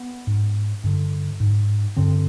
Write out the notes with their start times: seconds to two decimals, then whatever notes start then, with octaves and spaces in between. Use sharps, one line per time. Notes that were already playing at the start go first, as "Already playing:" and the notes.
Already playing: B3
0.27 G#2
0.84 G2 D3
1.40 G#2
1.97 G2 D3 C4